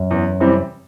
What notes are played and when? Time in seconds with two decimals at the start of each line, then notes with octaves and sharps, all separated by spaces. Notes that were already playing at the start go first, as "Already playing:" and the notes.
Already playing: F#2
0.11 E2
0.40 C3 E3 G3 C4